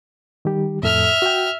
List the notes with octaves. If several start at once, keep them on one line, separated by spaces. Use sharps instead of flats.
D#3 G3 G4
F2 A2 A4 E5 F6
F#4 G5